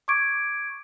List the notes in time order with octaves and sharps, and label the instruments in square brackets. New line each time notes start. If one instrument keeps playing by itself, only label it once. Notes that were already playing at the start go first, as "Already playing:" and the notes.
[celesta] C#6 D6 G#6 D7